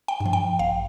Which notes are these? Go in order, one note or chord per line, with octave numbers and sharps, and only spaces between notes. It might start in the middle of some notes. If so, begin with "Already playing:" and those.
G5
G2
F3
G5
A1 F5